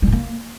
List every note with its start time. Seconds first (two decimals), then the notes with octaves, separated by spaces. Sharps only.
0.02 G3
0.07 A2
0.12 A#3